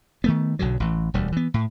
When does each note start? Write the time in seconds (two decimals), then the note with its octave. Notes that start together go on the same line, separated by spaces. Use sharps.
0.24 D#3 A3 B3
0.59 B1 B2 D3 F#3
0.80 A1 E3
1.14 E1 D2 G3
1.32 E3 B3
1.54 A2